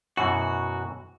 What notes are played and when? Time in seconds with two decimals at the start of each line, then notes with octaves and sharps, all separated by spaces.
0.17 F#2 B2 E3 F#4